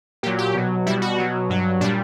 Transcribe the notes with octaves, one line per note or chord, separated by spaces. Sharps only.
A#2 F#3 G4
G4
B2 F#3
B2 G3 E4
F#4
B2 F#3
G2 F#3
A#2 G3 D4